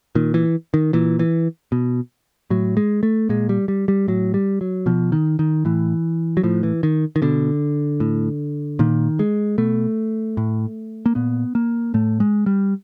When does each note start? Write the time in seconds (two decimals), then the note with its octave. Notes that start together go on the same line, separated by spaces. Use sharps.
0.15 A#2 D#3
0.34 E3
0.74 D#3
0.93 A#2 E3
1.19 E3
1.72 B2
2.50 A2 F#3
2.77 G#3
3.03 A3
3.29 A#2 G#3
3.49 G3
3.68 G3
3.88 G3
4.08 A2 F#3
4.34 G3
4.61 F#3
4.86 B2 F3
5.12 D#3
5.39 D#3
5.65 A2 E3
6.37 F#3
6.43 A2 F3
6.63 E3
6.83 D#3
7.16 D#3
7.22 B2 D3
8.00 A2
8.79 A#2 D#3
9.19 G#3
9.58 B2 A3
10.37 A2
11.06 A#3
11.15 A#2 B3
11.55 A#3
11.94 A2 A3
12.20 G#3
12.46 G3